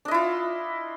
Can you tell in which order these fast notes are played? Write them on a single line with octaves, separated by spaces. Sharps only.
D4 D#5 E4 F4